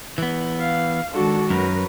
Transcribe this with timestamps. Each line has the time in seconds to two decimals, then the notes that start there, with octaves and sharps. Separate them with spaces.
0.18 E3 B3
0.60 F5
1.13 D#3 G#3 D4 F#4 A4
1.50 F#2 F#3 A#4 B4